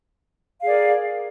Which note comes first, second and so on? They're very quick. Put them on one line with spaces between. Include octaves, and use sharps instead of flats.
F5 G#4 D5 A#4